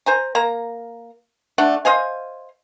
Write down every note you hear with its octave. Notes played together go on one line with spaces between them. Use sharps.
C5 G#5 A#5
A#3 A#5
A3 D4 F#5
C5 D#5 F5 G#5